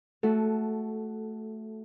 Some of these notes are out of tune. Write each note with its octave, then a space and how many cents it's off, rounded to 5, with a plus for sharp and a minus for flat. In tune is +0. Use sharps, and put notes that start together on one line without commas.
A3 +0 F#4 +0 A4 -15